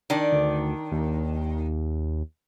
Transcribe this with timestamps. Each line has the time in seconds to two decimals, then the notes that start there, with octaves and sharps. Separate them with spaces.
0.10 D#3 D4
0.32 D2
0.92 D#2